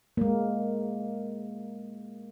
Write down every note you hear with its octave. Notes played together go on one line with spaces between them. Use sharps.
G#3 A#3